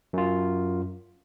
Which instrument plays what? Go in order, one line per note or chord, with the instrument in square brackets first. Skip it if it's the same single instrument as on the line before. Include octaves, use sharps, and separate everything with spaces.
[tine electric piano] F#2 F4